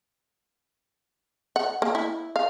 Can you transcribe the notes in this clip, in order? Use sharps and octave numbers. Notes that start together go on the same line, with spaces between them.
F#5
A#3
E4
F5